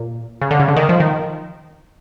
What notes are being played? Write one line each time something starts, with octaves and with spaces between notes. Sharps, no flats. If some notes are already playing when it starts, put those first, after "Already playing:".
Already playing: A#2
C#3
D3
C#3
D3
D#3
F3
D#3